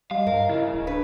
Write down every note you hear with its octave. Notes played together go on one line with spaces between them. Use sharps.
G3 D#5 F5
G2 A#4
C#3 E4
D1
D4 B4